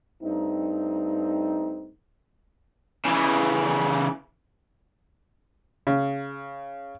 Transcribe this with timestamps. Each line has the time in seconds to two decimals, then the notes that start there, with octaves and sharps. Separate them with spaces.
0.23 G2 A3 C4 D#4
3.05 C#3 E3
5.87 C#3